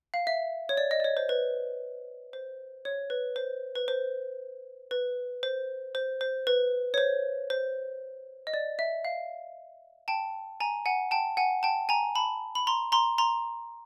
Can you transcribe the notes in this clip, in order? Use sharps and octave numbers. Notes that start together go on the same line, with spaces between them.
F5
E5
C#5
D5
D#5
D5
C#5
C5
B4
C5
C#5
B4
C5
B4
C5
B4
C5
C5
C5
B4
C#5
C5
C5
D#5
D5
E5
F5
G5 A5
G#5 A#5
F#5 G#5
G5 A5
F#5 G#5
G5 A5
G#5 A#5
A5 B5
B5
A#5 C6
A#5 C6
A#5 C6